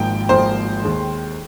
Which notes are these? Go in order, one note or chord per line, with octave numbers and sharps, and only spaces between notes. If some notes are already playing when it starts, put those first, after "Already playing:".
Already playing: G#1 G#2 F3 A#3 G5
G#1 G#2 F3 A#3 C5
D#2 D#3 G#3